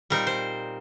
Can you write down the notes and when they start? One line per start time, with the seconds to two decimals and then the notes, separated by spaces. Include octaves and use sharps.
0.10 A#2 G3 C4 D#4 A#4
0.27 C5